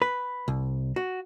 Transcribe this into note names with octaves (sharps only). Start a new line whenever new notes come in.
B4
C2
F#4